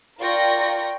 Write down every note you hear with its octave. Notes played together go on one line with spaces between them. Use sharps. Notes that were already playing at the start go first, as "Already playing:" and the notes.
F4 A#4 D5 G5 C#6 A#6